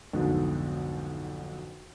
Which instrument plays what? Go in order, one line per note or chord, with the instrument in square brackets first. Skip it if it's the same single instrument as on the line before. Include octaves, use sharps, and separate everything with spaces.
[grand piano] B1 F2 G#2 B2 D3